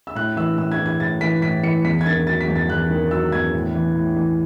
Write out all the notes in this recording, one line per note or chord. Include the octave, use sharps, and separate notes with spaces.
E6
A2 F#6
E3 E6
A2 E6
G#6
E3
G#6
A2 A6
E3 B6
A2 B6
E3 C#7
E2 B6
G#6
D#3 A6
F#3 A6
B6
E2
A6
E2 F#6
D#3
F#3 E6
E2 G#6
A2
E3
A2
E3